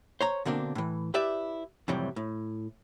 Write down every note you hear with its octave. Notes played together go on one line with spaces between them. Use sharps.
C5 C#5 A#5
B2 D3 A#3 C4 D4
A2 E3
E4 G4 B4 D5 E5
F2 A2 C3 E3 F#3 G3
A2